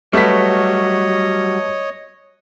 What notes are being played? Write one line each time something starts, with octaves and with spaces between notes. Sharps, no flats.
F#3 G3 A3 B4 C#5 D#5 B6